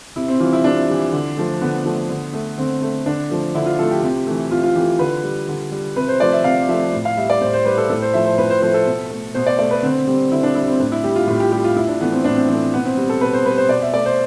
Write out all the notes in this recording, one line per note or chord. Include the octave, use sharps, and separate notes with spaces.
C3 E4
C4
E3 G3 F4
E4
C3 D4
E3 G3
D3
F3 A3
D3 B3
F3 A3
D3
A3
D3 C4
A3
D3 D4
F3 A3
D3 E4
F4
F3 A3 A4
G4
C3 G4
E3 A3
C3 F4
F4
E3 A3 G4
D3 B4
G3
D3
G3
C3 B4
C5
F3 A3 D5
E5
C3 F5
F3 A3 E5
A2
F5
G3 E5
D5
A2 C5
C5
G3 B4
A4
A2 A4
C5
F3 A3 E5
C5
A2 B4
C5
F3 A3 C5
A4
B2
A3
B2 C5
D5
A3 D5
B4
D3 C4
G3 C4
D3 E4
D4
G3 E4
C4
A2 D4
E4
G3 G4
F4
A2 F4
G4
G3 G4
F4
A2 E4
D4
E3 A3 B3
C4
A2 D4
C4
E3 A3 C4
B2 B3
C4
G3
A4
B2 B4
C5
G3 B4
C5
B2 D5
E5
A3 D5
C5